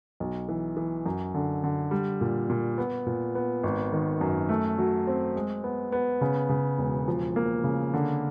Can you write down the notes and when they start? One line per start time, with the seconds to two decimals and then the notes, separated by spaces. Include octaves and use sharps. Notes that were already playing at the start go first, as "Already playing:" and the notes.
0.20 B1
0.49 E3
0.77 E3
1.06 F#2
1.34 D3
1.64 D3
1.91 G3
2.21 A#2
2.50 A#2
2.78 B3
3.06 A#2
3.35 B3
3.63 G#1
3.92 D#3
4.21 F#2
4.49 A3
4.78 F#3
5.07 C4
5.36 G#3
5.64 B3
5.92 B3
6.21 C#3
6.49 C#3
6.79 E1
7.08 F3
7.36 A#3
7.64 C#3
7.94 D3